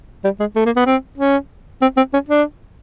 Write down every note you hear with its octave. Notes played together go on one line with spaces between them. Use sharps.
G3
G#3
A3
A#3
B3
C4
C#4
C4
C4
C#4
D4